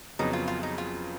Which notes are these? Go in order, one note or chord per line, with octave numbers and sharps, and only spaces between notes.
F2 C#3 F#3 B3 D#4
F4
F4
D#4
F4